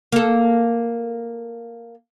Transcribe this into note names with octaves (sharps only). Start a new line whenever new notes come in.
A#3 A4